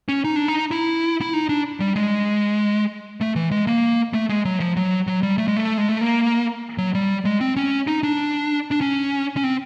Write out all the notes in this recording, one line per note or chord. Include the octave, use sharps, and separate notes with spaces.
C#4
D#4
D4
D#4
E4
E4
D#4
D4
G3
G#3
A3
E3
G#3
A#3
A3
G#3
F#3
F3
F#3
F#3
G3
A3
G#3
A3
G#3
A3
A#3
F#3
G3
G#3
C4
C#4
D#4
D4
D4
C#4
C#4
C4